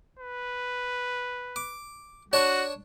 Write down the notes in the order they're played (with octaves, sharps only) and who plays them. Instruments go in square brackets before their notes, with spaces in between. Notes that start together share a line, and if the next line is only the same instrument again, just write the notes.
[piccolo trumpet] B4
[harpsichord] D6
[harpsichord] D4 C#5 A5 [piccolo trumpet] F#4